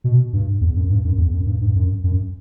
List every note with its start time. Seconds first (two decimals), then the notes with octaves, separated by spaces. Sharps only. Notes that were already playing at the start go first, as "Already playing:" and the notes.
0.04 B2
0.33 G2
0.61 E2
0.76 F#2
0.90 G2
1.05 F#2
1.18 E2
1.33 F#2
1.46 G2
1.61 G2
1.76 F#2
2.04 F#2